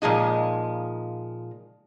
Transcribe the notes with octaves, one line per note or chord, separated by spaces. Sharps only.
A#2 F3 G#3 D#4